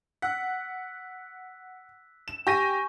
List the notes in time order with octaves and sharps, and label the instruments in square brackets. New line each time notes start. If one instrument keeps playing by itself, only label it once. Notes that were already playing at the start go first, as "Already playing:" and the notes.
[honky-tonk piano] F#5 [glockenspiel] E6 F#6 B6
[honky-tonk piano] E7
[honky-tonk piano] G4 A#6 D#7 [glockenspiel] G#5 C#6 G6